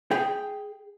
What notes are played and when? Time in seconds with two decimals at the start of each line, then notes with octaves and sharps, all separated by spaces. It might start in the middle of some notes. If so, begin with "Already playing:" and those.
0.11 G#4 G5